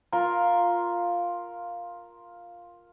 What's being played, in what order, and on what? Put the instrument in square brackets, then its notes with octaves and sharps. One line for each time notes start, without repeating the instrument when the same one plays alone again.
[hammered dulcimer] F4 A#4 C6